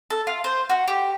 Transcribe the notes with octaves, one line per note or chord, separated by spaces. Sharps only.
A4
F4
C5
F#4
G4